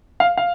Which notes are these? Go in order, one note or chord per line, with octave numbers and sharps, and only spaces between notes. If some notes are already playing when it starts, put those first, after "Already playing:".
F5
F5